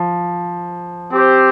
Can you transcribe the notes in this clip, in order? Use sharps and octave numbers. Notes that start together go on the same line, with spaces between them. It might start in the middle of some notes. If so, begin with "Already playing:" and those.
Already playing: F3
C4 G4 C5